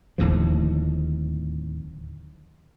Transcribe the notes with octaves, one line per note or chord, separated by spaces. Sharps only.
D1 D#2 A2 F3